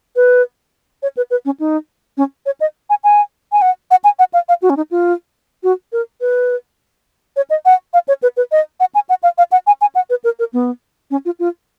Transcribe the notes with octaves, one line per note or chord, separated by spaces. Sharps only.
B4
C#5
B4
B4
C#4
D#4
C#4
C#5
D#5
G#5
G#5
G#5
F#5
F#5
G#5
F#5
F5
F5
F#4
C#4
D#4
F4
F#4
A#4
B4
C#5
D#5
F#5
F5
C#5
B4
B4
D#5
F#5
G#5
F#5
F5
F5
F#5
G#5
G#5
F#5
B4
A#4
A#4
B3
C#4
F4
F4